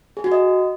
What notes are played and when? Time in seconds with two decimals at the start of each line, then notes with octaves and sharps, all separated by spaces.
0.17 G#4
0.24 F#4
0.32 D#5